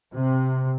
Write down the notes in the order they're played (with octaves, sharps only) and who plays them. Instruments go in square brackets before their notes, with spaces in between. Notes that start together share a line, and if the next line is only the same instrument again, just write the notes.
[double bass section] C3